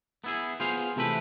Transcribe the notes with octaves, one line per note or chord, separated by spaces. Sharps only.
B3 E4 G#4
B3 F4 G#4 C5 F5
C3 E3 A3 E4 B4